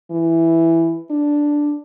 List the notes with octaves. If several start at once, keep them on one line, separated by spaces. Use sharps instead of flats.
E3
D4